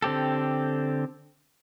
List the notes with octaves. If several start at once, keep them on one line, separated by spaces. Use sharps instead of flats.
D3 C4 G4 A4